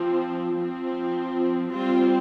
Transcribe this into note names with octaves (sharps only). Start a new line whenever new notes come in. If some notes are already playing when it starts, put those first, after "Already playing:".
Already playing: F3 C4
F3 C4
G3 C4 F4